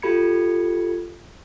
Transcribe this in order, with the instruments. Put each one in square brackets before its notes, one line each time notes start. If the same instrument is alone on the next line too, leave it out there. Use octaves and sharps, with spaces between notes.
[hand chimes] F4 G4 A4 B5 G#6 C#7